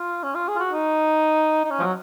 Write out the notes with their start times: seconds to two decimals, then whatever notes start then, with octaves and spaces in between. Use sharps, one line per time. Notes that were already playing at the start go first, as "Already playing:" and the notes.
Already playing: F4
0.23 C#4
0.35 F4
0.48 G#4
0.56 F4
0.59 F#4
0.72 D#4
1.65 D#4
1.71 C#4
1.79 F3
1.83 F#3